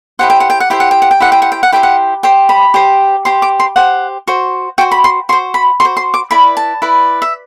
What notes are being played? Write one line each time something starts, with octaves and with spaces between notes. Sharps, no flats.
E4 G4 C5 F#5
G5
F#5
G5
F#5
E4 G4 C5 G5
F#5
G5
F#5
G5
E4 G4 C5 F#5
G5
F#5
G5
F#5
E4 G4 C5 G5
F#5
G4 C5 G5
B5
G4 C5
G4 C5 C6
D6
C6
G4 C5 F#5
F#4 C5
F#4 C5 G5
B5
C6
F#4 C5 C6
B5
F#4 C5 C6
C6
D6
E4 B4 D5 B5
A5
E4 B4 D5
E5